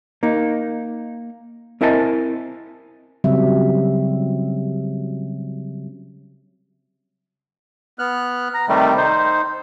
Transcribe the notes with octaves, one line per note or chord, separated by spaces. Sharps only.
A#3 D#4
C4 E4 A#4 D#5 G#5 A5
C#3 F#3 G3 C4 E5
B3 F6 F#6
A#5
C3 D#3 G3 A3
D#4 C5